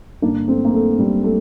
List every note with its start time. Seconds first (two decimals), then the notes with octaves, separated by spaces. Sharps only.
0.22 G2 A#3 D4
0.25 D3
0.48 A3 C4
0.65 A#3
0.73 A3
0.98 G3
1.23 A3